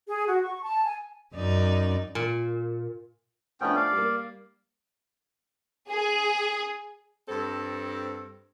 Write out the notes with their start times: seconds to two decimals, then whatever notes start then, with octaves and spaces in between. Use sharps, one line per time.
0.08 G#4
0.27 F#4
0.43 C#6
0.63 A5
0.85 G#5
1.35 F#2 C#4 D#4 D5
2.15 A#2
3.61 F3 A3 B3 C#4 D4 G5
3.76 D5 F5
3.92 G3 A#3
5.89 G#4
7.28 G2 C4 A4